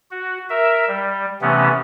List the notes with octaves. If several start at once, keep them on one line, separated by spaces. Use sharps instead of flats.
F#4
A#4 E5
G3
C3 E3 A3 B3 C#4